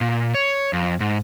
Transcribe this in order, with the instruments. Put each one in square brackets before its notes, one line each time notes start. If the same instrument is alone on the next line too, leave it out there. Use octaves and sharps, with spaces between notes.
[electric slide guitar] A#2
C#5
F2
G#2